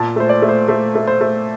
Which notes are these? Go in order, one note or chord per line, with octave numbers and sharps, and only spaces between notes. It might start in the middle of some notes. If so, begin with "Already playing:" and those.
Already playing: A#2 A5
A3 C5
D5
A3
C5
A3 C5
A3
C5
A3